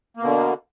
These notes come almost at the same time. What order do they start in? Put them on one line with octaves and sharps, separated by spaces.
A#3 B2 D3